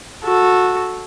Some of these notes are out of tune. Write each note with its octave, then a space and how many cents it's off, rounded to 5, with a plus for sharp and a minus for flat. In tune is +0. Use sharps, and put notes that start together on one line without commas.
F#4 -15 A4 +0